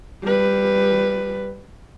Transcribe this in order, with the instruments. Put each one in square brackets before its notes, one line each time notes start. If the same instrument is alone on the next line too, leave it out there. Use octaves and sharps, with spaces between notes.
[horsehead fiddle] G3 B4